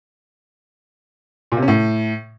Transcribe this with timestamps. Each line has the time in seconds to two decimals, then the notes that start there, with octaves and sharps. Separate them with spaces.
1.52 A#2
1.57 C3
1.62 C#4
1.68 A2